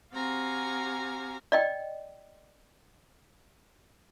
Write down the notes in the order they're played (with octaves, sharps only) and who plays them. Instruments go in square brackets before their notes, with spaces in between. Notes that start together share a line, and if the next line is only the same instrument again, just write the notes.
[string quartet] C4 F#4 G4 F5 G#5 A#5
[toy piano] D5 D#5 G5